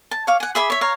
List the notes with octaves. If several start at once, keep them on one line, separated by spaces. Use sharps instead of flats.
A5
C#5 F5 D6
F#5 G#5
G#4 E5 B5 D6
C#5 E5
C#5 F5 A#5